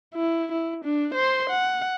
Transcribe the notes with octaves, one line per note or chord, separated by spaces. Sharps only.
E4
E4
D4
C5 C6
F#5